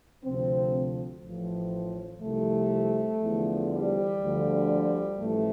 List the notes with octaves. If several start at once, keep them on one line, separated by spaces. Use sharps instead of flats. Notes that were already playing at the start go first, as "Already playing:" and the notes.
D2 C3 F3 C4
A1 A2 F3
C2 C3 F3 A3
E2 D3 F3
G3
D2 D3 F3
A1 A2 F3 A3